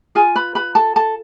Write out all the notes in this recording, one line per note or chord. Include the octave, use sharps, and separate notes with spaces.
F4 G#4 G#5
B4 B5
B4 B5
A4 A5
A4 A5